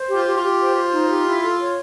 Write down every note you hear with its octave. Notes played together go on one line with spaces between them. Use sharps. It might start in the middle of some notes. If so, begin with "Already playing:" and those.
Already playing: C5
G4
F4
G4
F4
G4
C5
C5
D#4
G4
E4
A4
C#5